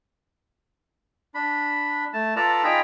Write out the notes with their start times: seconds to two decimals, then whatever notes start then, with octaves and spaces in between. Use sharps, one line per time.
1.35 D4 B5
2.13 A3 A5
2.36 F4 A4 B4 D5 A5 A#5
2.64 D#4 F4 G#4 G5 A#5 B5